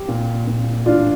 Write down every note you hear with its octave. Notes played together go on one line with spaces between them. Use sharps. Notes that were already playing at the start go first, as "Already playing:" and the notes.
Already playing: G4
A#2
A#2
A2 E3 D4 F4